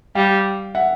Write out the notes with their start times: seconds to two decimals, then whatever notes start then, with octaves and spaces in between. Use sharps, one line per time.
0.15 G3 F5 G5
0.75 E5 F#5